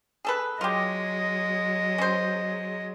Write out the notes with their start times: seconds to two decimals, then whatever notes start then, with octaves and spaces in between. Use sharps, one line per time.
0.25 G#4 A4 B4
0.61 F#3 G#3 F4 G4 D#5
1.98 C#4 C5